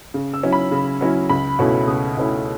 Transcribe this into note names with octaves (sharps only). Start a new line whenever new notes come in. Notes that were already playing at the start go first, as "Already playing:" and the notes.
C#3
E6
F#3 C#4 E4
B5
C#3
F#3 C#4 E4
C#2 B5
B2 A3 C#4 E4
C#2 D#6
B2 A3 C#4 E4